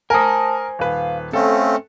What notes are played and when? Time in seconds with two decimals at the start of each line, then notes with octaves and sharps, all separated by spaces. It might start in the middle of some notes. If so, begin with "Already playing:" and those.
0.10 A#4 C5 G#5 A5 D#6
0.79 D#1 B4 F5
1.33 A3 C4 C#4 A4 F5